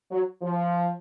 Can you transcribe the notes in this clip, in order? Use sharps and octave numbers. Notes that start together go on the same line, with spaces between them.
F#3
F3